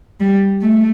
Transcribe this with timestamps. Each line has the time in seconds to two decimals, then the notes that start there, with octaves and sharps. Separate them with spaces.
0.20 G3
0.62 A3